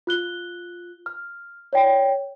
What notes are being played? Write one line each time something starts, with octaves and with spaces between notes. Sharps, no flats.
F4 F#6 G7
F6
C#5 D5 G5